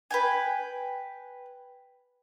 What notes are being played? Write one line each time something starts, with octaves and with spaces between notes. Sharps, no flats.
B4 G5 G#5